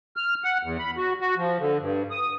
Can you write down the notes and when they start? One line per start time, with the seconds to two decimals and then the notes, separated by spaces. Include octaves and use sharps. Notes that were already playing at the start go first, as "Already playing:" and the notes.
0.16 F6
0.44 F#5
0.63 E2
0.79 B5
0.97 F#4
1.20 F#4
1.37 F3
1.60 D3
1.80 G2
2.11 D#6